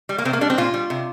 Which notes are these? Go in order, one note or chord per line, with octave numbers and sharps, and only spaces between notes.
G3
A#3
C3 C4
A#3
G3 D4
C4
A#2 F4
G3
C3